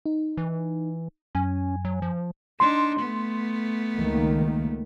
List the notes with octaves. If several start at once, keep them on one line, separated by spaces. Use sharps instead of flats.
D#4
E3
F#2 C#4 G#5
F#3
F3
D4 D#4 C6
A3 B3
C#2 D#3 A#3